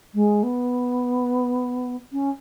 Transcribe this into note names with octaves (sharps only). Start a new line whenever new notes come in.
G#3
B3
C#4